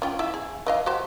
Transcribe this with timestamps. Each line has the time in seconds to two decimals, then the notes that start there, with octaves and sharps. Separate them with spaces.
0.02 C#4 F4 G5
0.19 E4 E5
0.34 G#4
0.67 E3 D#5 F5
0.86 F#4 G4 C5